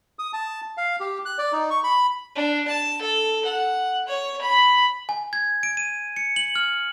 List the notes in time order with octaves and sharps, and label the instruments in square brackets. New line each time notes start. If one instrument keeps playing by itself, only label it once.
[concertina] D#6
A5
F5
G4
F#6
D5
D#4
C#6
B5
[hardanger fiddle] D4
A5
A4
F#5
C#5
B5
[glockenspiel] G#5
G#6
D7
D#7
C#7
F#7
F6